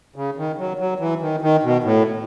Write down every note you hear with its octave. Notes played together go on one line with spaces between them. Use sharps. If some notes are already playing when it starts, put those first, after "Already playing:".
C#3
D#3
F#3
F#3
E3
D#3
D#3
B2
A2